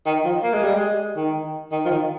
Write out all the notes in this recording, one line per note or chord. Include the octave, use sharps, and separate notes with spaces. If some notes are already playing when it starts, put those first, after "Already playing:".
D#3
F3
A#3
G#3
G3
G#3
D#3
D#3
F3
D#3